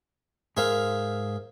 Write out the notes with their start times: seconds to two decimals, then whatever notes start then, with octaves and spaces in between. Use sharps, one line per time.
0.57 G#2 G#4 A#4 C5 E5 F5